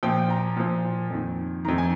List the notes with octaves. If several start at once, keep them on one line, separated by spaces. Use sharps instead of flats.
A#2 F3 G5
A#5
A#2 F3
F2 D#3
F2 D#3 A#5
G#5